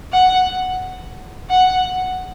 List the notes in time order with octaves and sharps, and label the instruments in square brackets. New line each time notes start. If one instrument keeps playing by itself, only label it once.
[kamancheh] F#5
F#5